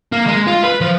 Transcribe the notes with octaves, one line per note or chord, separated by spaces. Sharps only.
A#3
G#3
F4
B4
F3